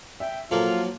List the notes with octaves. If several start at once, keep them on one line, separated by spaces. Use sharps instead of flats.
E5 G5
F3 F#3 A#3 F4 A4 A#4